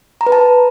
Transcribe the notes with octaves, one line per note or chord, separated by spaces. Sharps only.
A#5
B4
A5